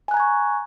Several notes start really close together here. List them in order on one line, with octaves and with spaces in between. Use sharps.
G#5 F#6 A#5 G#6 C#6